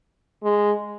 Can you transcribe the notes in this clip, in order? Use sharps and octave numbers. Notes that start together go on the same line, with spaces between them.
G#3